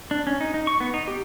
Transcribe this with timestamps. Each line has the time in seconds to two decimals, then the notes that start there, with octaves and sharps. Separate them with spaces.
0.11 D4
0.27 C#4
0.41 D#4
0.54 D#4
0.67 C#6
0.80 B3
0.94 D#4
1.08 G4